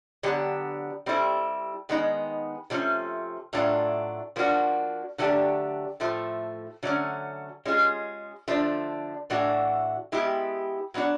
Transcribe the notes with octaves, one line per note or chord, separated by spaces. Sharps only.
D3 F#3 B3 D4 G4
G3 C4 E4 A4
D#3 G#3 B3 D#4
C3 F3 A3 C#4
A2 F#3 A3 D4 F4
F3 A#3 D4 F#4
D3 F#3 A3 D4 G4
A2 F3 A3
D3 F#3 A3 C#4
G#3 C#4 F4 G#4
D3 F3 A3 D4
A2 E3 A3 D4 F#4
G#3 B3 E4 G4
F#3 B3 D4 F#4